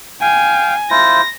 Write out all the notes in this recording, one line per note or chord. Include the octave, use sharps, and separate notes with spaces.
F5 G5 G#5
E4 F4 C5 A#6